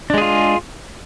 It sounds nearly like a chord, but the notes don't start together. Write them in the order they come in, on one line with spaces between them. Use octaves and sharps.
D4 G#3 G#4 F4